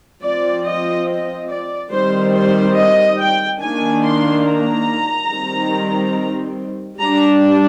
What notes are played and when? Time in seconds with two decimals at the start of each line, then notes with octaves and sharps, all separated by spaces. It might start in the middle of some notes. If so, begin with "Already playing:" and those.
0.22 F3 C4 D5
0.65 D#5
1.06 D#5
1.49 D5
1.91 D#3 G3 C4 C5
2.33 C5
2.76 D#5
3.19 G5
3.60 D#3 A#3 D4 G#5
4.03 C6
4.45 A#5
5.30 D#3 G3 C4
6.99 G3 D4 A#5